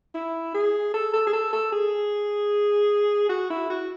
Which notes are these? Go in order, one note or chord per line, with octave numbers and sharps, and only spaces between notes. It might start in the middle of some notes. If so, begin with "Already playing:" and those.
E4
G#4
A4
A4
G#4
A4
A4
G#4
F#4
E4
F#4